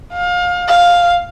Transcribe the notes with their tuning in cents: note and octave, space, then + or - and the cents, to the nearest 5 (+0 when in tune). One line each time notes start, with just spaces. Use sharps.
F5 +30
F5 +5